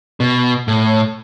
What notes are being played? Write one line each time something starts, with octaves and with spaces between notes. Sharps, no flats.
B2
A2